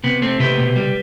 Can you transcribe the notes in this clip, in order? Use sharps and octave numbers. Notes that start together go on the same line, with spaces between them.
C3 B3
A3 C4
C3 G4 B4
B2
G3